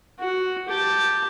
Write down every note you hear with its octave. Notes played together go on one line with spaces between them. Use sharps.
F#4
G4 A5